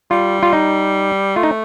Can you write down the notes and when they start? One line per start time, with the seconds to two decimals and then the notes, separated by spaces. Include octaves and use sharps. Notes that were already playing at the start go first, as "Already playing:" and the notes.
0.11 G3 F4
0.43 F4
0.53 D#4
1.36 A3 F4
1.43 D#4